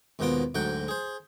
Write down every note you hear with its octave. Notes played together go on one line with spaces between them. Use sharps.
D#2 G#2 B2 B3 F4 D6
D2 G#2 F#3 F#5 G5
G#4 C5